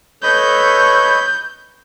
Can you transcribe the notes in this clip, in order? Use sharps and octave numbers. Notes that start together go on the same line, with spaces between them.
A4 B4 C#5 D#5 B5 G6